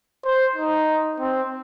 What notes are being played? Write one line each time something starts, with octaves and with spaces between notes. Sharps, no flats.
C5
D#4
C4